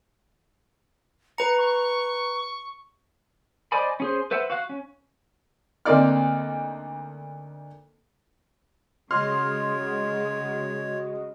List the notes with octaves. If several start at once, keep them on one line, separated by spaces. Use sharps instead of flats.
B4 A#5 C#7
C#6
C5 D5 D#5 G#5 B5
C#4 G#4 C5
B4 C5 E5 F#5
F#4 F5 F#6
C#4
D2 A#3 C4 D#4 D5 F6
C#3 G#3 F#4 C#5 D#5 C6 F6